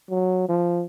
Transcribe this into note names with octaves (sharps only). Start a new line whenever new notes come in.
F#3
F3